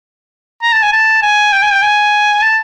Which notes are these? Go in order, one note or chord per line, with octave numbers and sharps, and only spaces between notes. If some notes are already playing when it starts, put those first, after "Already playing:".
A#5
A5
G#5
A5
G#5
G5
G#5
G5
G#5
A5